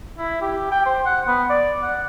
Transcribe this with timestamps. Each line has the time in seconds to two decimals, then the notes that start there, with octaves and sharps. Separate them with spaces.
0.18 E4
0.42 G4
0.71 G5
0.86 C5
1.06 F#5
1.27 B3
1.50 D5
1.82 F#5